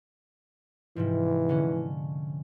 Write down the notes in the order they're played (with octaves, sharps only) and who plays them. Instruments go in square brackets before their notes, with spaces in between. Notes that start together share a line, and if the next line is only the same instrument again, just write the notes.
[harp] G#2 C3 F3 [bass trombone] E3
[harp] D3 C#4